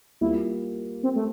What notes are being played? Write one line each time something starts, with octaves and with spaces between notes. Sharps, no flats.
G3 A#3 E4 F4
C4
A3